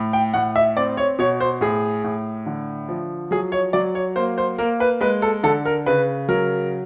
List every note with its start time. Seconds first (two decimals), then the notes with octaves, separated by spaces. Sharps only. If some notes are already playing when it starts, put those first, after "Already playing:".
Already playing: A2
0.13 G5
0.34 A2 F#5
0.56 E5
0.77 C4 D5
0.97 C#5
1.19 B2 C#5
1.40 C5
1.61 A2 G#4
2.04 A2
2.46 D3
2.89 F3
3.31 F#3 G#4
3.52 C#5
3.73 F#3 D5
3.95 C#5
4.16 A#3 C5
4.38 C5
4.58 A#3 A#4
4.80 B4
5.01 G#3 B4
5.22 A4
5.43 D3 A4
5.65 A#4
5.86 C#3 B4
6.28 F#3 A#4